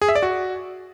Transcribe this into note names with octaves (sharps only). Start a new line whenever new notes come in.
G#4
E5
D5
F#4